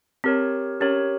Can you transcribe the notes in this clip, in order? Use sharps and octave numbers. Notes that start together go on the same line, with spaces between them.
C4 G4 A#4 C#5
C#4 G4 A#4 C#5